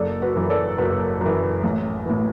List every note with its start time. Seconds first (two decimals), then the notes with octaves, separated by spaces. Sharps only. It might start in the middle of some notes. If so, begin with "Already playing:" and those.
Already playing: F#1 A4 D5
0.22 F#4 B4
0.35 F#2 E3
0.50 A4 D5
0.78 F#1 F#4 B4
1.21 F#2 E3
1.63 A1
2.06 A2 E3